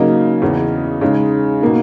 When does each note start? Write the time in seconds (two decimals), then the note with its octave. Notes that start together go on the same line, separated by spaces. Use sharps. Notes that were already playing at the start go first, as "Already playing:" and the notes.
Already playing: C#3 F#3 A#3 D#4 D#5
0.42 E2 C#3 E3
1.01 C#3 G#3 D#4
1.61 B2 A#3 D#4